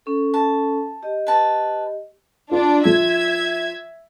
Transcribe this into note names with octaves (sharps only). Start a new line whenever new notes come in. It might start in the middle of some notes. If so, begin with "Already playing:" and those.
C#4 A4
A5
G4 D#5
B4 A5
D4 F4 D5
F3 E5 G#6